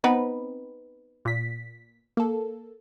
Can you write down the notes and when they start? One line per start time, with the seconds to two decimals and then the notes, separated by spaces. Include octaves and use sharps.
0.04 B3 C4 D#4 B4
1.25 A#2 B6
2.17 A#3 A4